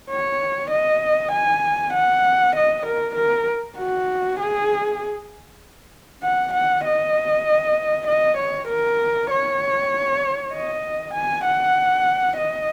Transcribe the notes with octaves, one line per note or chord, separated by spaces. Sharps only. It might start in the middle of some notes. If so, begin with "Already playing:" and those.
C#5
D#5
G#5
F#5
D#5
A#4
A#4
F#4
G#4
F#5
F#5
D#5
D#5
C#5
A#4
C#5
D#5
G#5
F#5
D#5